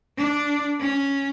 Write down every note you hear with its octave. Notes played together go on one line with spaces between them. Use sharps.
D4
C#4